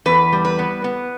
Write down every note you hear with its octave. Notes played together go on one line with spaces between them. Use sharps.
E2 B4
G3
B4
B3
B3